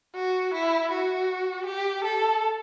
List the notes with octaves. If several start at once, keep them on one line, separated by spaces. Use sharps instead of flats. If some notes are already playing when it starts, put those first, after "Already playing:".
F#4
E4
F#4
G4
A4